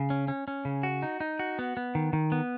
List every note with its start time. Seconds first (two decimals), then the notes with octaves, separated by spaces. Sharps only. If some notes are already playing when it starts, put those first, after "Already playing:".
Already playing: C#3
0.10 C#4
0.28 C#4
0.48 C#4
0.65 C#3
0.83 F#4
1.02 D#4
1.20 D#4
1.39 F#4
1.59 B3
1.77 B3
1.95 D#3
2.13 D#3
2.32 B3